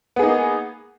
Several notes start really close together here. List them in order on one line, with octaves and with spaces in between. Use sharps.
B3 G#4 D#4 A#3